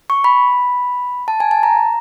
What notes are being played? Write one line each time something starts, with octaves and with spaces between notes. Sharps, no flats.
C#6
B5
A5
G#5
A5
A#5